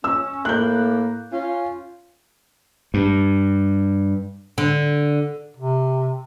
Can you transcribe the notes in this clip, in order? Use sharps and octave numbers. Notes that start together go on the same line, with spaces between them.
C#4 E6
A2 A#3 F#6 G6
C#4 F4
G2
D3
C3